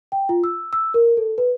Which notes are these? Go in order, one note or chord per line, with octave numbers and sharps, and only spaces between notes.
G5
F4
E6
E6
A#4
A4
B4